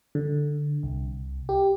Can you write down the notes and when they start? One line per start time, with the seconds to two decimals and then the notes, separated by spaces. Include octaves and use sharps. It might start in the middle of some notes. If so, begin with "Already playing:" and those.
0.15 D3
0.83 C2
1.49 G4